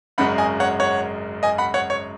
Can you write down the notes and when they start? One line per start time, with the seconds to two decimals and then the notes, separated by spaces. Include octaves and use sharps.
0.18 G#1 F#2 C#3 G#3 F#5 B5
0.38 D#5 G#5
0.60 C#5 F#5
0.80 C#5 F#5
1.43 D#5 G#5
1.58 F#5 B5
1.74 C#5 F#5
1.90 C#5